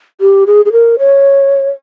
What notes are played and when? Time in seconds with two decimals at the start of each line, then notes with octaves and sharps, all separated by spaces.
0.21 G4
0.47 G#4
0.65 G#4
0.72 A#4
0.99 C#5